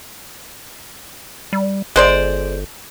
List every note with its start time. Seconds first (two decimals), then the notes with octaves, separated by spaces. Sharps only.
1.53 G3
1.96 G1 G#3 C5 D5